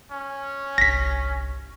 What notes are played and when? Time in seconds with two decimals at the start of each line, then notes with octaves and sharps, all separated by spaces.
0.12 C#4
0.78 G1 C2 A#6 B6